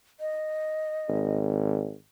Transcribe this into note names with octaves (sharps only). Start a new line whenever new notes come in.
D#5
G#1